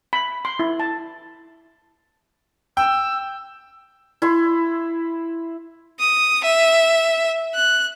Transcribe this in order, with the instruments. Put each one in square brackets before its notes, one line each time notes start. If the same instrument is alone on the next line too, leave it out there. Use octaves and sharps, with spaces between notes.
[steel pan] B5
C6
E4
A5
[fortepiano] G5 [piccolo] E6
[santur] E4 C6
[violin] D#6
E5
F#6